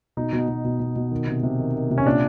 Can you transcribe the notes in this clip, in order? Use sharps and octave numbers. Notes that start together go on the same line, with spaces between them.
B2 D#4
B2
B2
B2
B2
B2
D#3
C3
C3
D#3
D#3
C3
C#4
A#2 D4